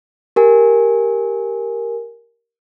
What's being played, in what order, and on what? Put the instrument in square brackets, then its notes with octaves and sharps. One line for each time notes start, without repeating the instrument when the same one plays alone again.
[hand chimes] G4 A#4 G#5